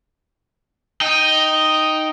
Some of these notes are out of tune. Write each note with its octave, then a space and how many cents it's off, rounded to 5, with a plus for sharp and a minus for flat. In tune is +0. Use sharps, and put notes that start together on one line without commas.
D#4 +0 G5 +0